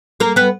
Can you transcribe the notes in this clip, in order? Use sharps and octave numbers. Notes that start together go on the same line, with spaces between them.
A#3 A#4
B3 B4